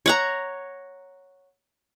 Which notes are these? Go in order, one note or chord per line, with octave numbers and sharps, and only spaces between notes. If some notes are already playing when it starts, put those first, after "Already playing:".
C#5 F#5 A#5